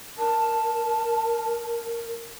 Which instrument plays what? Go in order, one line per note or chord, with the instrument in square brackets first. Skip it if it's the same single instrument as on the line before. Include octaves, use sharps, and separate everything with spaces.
[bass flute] A#4 [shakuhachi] A5